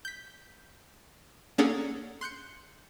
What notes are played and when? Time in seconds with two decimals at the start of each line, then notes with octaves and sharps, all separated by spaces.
0.05 G6 B6
1.58 A#3 C#4 D4 G#4 A4 F#5
2.21 C6 F#6 G6 C#7